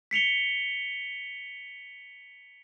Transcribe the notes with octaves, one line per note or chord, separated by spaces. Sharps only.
B6 C#7 F7 G7